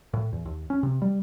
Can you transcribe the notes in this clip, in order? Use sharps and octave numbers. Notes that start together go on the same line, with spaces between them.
A2
E2
D#2
C#4
C3
G3